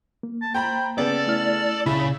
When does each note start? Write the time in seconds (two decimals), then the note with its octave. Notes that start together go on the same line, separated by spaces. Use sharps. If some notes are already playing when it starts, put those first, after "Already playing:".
0.23 A#3
0.41 A5
0.54 C5 G5 A#5 B5
0.98 C#3 B3 A4 D5 F#7
1.27 A3 E4 F6
1.86 C#2 A#2 C#3 E4 B5